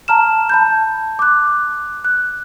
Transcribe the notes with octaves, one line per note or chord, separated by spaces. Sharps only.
A5 A#5 F6 E7
A5 B5 G6
D6 F#6
F#6